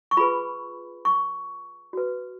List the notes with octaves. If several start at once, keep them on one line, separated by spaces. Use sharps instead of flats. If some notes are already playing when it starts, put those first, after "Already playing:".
C#6
F4 G#4 B4 B5
C#6
F#4 B4